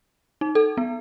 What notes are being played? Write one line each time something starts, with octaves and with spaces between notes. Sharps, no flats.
D#4
A4
B3